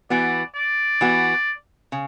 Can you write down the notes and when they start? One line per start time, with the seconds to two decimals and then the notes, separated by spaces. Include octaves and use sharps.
0.10 E3 B3 F#4 D5
0.56 D5
1.01 E3 B3 F#4
1.92 C#3